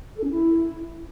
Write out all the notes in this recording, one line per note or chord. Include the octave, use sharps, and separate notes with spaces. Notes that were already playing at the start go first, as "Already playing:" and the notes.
A4
C#4
E4